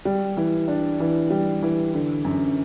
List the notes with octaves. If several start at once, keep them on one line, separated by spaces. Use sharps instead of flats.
G3
E3
D4
E3
G3
E3
D3
F#2